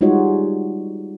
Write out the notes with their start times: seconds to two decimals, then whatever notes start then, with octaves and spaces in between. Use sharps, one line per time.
0.01 G3 G#3 D#4 F4 F#4 C#5